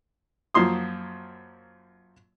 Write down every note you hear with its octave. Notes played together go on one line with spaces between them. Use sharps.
F#2 F3 A#3 C6 D#6